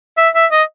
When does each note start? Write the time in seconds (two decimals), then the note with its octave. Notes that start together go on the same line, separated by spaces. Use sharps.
0.17 E5
0.35 E5
0.52 D#5